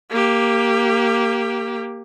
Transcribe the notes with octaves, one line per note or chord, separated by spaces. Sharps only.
A#3 G4